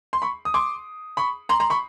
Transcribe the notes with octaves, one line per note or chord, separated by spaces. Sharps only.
C6
B5 C#6
D#6
C6 D6
B5 C#6
A#5 C6
A#5 C6
B5 C#6